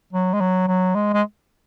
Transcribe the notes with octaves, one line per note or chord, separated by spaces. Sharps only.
F#3
G#3
F#3
F#3
G#3
G#3